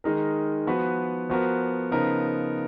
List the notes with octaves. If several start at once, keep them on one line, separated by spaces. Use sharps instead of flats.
D#3 G#3 D#4 A#4
F3 B3 F#4 B4
F3 B3 F#4 A#4
C#3 F3 B3 D#4 A#4